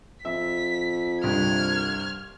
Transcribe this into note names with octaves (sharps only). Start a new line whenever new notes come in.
F2 E5 B6
C2 G2 F6 G#6